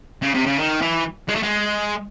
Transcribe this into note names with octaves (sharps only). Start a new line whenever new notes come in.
C#3
C3
C#3
D#3
E3
G#3
A3
G#3